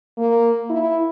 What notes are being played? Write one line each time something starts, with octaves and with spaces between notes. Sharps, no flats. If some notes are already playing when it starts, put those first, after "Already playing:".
A#3
E4